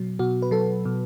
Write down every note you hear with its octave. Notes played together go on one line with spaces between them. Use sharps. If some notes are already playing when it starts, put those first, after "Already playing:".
Already playing: B2 F#3
B2 F#4
B4
F#3 A4
B2